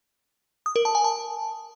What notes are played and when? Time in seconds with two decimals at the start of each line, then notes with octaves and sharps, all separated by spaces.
0.66 D#6
0.76 A#4
0.85 A5
0.95 G#5
1.04 A5